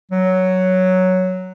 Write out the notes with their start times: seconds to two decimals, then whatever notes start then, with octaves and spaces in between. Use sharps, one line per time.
0.12 F#3